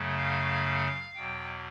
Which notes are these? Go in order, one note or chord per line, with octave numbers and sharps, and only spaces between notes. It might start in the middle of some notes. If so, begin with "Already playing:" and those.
Already playing: F#2 C#3 F#3 A3
F5
E2 B2 F#3 G5